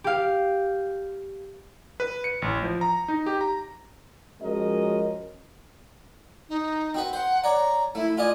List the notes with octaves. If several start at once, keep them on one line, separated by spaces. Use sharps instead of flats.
G4 F5
B4
C#7
A1
F3
A#5
D#4
G4
A#5
F3 G#3 C#4 F#4 A#4 D#5
D#4
C4 F#4 B4
C5 F#5
C#5 D5 A#5
A3 E4
F4 D5 D#5 G#5